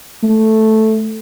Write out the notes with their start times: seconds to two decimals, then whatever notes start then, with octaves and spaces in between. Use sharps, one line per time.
0.23 A3